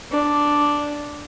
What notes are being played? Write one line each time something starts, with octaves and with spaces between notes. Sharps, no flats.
D4